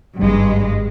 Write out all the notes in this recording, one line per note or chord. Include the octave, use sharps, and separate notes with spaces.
G#1 G2 G3 G#3